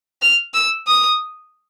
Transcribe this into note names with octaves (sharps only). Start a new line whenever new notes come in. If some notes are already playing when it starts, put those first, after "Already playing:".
F6
E6
D#6